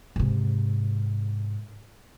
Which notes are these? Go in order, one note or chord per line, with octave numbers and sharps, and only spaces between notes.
G#2 C3